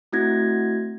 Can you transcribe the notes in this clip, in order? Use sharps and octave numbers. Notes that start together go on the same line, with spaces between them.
A3 C4 E4 F#4 G#6 A#6